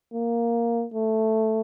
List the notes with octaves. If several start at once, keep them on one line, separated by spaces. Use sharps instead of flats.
A#3
A3